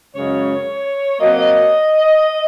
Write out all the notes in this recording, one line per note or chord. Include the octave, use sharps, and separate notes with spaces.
F#2 C#3 G#3 C#5
C3 F#3 A#3 D#5